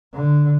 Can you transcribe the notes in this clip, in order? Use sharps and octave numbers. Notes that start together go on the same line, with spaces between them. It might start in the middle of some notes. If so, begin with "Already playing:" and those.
D3